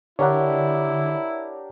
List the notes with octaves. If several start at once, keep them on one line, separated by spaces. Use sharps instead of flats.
D3 D4 E4 G4 A#4 C#5 F#5